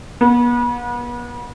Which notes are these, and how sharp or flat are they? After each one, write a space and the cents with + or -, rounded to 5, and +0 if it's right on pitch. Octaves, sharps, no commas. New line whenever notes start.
B3 -40